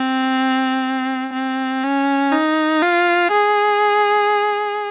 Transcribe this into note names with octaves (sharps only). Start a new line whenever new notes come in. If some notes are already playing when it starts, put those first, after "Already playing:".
Already playing: C4
C4
C#4
D#4
F4
G#4